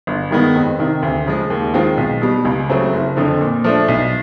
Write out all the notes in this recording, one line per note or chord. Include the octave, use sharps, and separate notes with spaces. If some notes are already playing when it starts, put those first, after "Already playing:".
G1
G2 D#3 G#3 B3
F2
C3 D#3
D2
C#3 F3 G#3
D#2
D#3 G#3 C4 F4
B1
B2 G3
C#2
C#3 F#3 A3 C4
F#1
F2 D3 F3
A#2
F3 A3 D4
B1